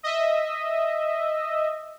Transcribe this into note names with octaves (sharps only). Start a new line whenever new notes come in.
D#5 E5